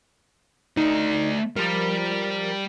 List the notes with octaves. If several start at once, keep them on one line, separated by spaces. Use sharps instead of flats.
A3 D#4 D5
F3 G3 A#4